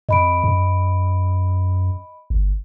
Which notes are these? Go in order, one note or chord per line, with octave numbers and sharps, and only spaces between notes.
F2 D#5 B5 D7
F#2
G1